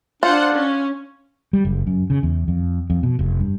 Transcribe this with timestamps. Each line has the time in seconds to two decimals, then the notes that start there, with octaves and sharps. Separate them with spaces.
0.23 D4 F4 C5 F#5
0.53 C#4
1.53 G3
1.65 F#1
1.87 F#2
2.10 C#3
2.23 E2
2.48 F2
2.90 F2
3.03 B2
3.19 F1
3.40 G2